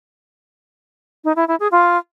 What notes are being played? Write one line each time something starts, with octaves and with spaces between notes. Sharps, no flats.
D#4
E4
E4
G#4
F4